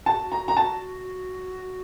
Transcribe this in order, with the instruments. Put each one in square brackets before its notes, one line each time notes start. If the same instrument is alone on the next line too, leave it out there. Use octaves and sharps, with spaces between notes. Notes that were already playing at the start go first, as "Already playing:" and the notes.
[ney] G#4 [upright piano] A5
[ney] F#4
[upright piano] A#5
A#5
A5